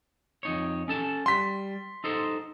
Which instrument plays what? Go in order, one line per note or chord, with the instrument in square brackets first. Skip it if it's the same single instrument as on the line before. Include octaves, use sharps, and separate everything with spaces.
[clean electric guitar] F2 D#4 C#5
C#4 A4 A5
[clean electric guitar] G3 [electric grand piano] C6 B6
[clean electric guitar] D#4 A4 C5